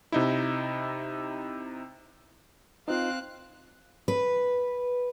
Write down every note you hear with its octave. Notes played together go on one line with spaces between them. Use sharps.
C3 D#4 E4
C4 D#4 F4 F5 F#6
B4